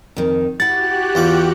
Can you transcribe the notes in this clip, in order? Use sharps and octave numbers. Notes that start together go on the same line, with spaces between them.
F2 D#3
E4 F#4 G4 F#5 F#6 A6
E2 F4 D6